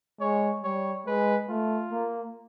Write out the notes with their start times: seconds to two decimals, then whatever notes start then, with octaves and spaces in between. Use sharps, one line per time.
0.20 G#3 C#5
0.63 G3 C#5
1.07 G#3 B4
1.49 A3 F4
1.92 A#3